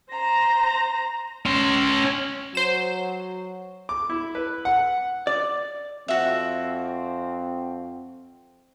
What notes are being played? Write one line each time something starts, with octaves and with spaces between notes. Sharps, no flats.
C5 A#5 A#6
C#4 C6
F#3 C5 E7
D6
E4
B4
F#5
D5
F2 C4 F#4 E5